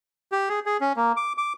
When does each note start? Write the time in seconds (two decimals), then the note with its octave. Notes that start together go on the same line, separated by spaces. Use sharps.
0.32 G4
0.49 G#4
0.66 G#4
0.81 C#4
0.96 A#3
1.17 D6
1.38 D6